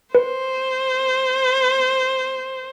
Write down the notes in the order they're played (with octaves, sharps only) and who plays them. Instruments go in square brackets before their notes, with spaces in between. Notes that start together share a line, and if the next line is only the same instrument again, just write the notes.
[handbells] B4 [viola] C5